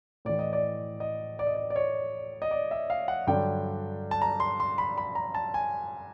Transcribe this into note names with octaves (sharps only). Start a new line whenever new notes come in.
A2 E3 D5
D#5
D5
D#5
D5
D#5
D5
D5
C#5
D#5
D5
E5
F5
F#5
G2 D3 F#3 G5
A5
A#5
C6
C6
B5
B5
A#5
A5
G#5